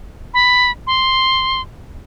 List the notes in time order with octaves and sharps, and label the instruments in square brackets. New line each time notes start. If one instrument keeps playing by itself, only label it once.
[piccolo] B5
C6